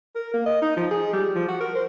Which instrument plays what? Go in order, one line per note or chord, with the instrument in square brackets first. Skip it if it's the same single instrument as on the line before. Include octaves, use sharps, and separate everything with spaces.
[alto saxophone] A#4
A#3
D#5
D#4
F3
G#4
G3
F3
F#4
A#4
C5